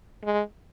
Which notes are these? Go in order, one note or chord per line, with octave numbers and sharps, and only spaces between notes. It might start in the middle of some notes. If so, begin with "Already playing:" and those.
G#3